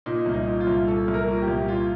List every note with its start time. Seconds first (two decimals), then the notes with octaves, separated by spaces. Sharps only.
0.06 A#2 D#4
0.26 C2
0.34 D#4
0.47 A#2
0.60 F4
0.67 C2
0.88 A#2 A4
1.08 C2
1.14 A#4
1.27 A#2
1.42 G4
1.48 C2
1.68 A#2 F4